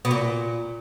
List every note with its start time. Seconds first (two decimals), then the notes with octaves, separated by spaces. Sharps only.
0.05 B2
0.11 A#2